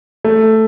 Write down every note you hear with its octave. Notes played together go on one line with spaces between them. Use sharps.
A3